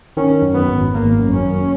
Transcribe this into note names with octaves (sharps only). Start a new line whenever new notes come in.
D#3 C#4
F#2
B3
G#1
G#1 A#3
F#2
C#4
F#2